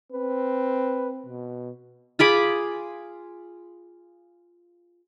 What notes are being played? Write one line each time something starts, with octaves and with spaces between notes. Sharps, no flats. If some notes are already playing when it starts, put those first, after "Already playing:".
C4 B4
B2
F4 G#4 B5 D6